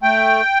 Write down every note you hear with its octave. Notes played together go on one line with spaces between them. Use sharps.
A3 G5